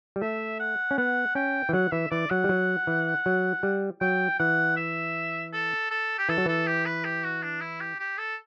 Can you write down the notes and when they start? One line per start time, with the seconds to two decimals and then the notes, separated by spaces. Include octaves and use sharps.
0.16 G3
0.22 A3 E5
0.60 F#5
0.91 C#4
0.98 B3 F#5
1.35 C#4 G5
1.69 E3
1.73 F#3 F#5
1.92 E3 E5
2.11 E3 D5
2.30 F#3 F#5
2.44 G3
2.49 F#3
2.87 E3
3.26 F#3
3.63 G3
4.01 F#3 G5
4.39 E3 F#5
4.77 E5
5.53 A4
5.91 A4
6.19 G4
6.29 E3 A4
6.38 F#3
6.46 E3 A4
6.67 G4
6.86 B4
7.05 G4
7.24 F#4
7.43 D4
7.62 E4
7.81 G4
8.00 G4
8.18 A4